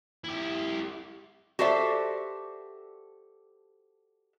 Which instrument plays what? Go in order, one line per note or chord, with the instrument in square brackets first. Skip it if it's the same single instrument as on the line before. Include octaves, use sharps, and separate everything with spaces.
[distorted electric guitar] E4 G4
[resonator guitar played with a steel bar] F#4 G4 A4 C5 D5 E5